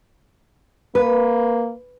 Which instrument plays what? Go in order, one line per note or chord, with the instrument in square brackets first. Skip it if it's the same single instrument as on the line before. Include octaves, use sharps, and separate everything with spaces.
[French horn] A#3 [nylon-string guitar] B4